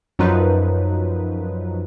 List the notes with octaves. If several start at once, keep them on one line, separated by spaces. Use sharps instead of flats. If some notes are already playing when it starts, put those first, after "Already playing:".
F#2 F3 F#3 D#4 F4 B4